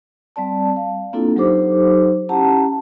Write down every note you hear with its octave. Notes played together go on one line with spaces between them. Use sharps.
G3 C4 D5 A5
F5
A#3 C4 D4 E4 F4 A4
F#3 D#4 G4 A4 C5 D6
C#4 E4 G4 F#5 A5 A#5